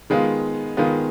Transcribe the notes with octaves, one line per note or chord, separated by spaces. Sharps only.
D#3 G#3 B3 F4
D#3 G#3 B3 F4